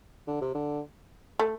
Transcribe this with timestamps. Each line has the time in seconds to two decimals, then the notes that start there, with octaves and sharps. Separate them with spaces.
0.27 D3
0.41 C3
0.55 D3
1.39 A3